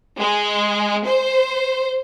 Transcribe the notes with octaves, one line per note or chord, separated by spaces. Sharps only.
G#3
C5